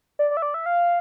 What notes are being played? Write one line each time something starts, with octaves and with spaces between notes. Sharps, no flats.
D5
D5
E5
D5
E5
F5